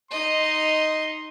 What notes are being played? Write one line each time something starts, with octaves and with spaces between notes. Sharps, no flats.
D#4 D#5 C6